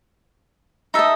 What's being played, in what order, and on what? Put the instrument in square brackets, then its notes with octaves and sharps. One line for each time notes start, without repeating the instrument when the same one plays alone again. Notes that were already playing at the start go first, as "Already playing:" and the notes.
[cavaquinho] D#4 A4 D#5 E5